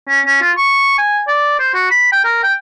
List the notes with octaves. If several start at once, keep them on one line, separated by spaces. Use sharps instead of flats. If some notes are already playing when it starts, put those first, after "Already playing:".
C#4
C#4
F4
C#6
G#5
D5
C5
F#4
B5
G5
A#4
G5